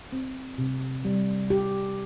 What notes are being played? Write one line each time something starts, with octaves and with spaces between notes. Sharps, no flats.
C4
C3
G3
G4